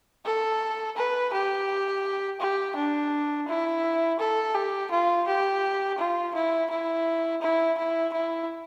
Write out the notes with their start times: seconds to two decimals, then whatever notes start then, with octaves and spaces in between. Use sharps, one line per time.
0.26 A4
0.97 B4
1.33 G4
2.40 G4
2.76 D4
3.48 E4
4.19 A4
4.55 G4
4.91 F4
5.27 G4
5.98 F4
6.35 E4
6.70 E4
7.42 E4
7.78 E4
8.13 E4